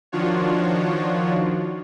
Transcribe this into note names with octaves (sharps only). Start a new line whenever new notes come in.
D#3 F3 D4 F4 F#4 C#5